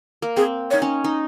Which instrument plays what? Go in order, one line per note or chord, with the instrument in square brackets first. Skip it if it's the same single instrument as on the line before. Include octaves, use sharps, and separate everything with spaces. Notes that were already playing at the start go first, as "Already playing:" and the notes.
[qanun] A#3
[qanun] C4 [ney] G#4
[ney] C#5
[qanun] D#4
C#4
D#4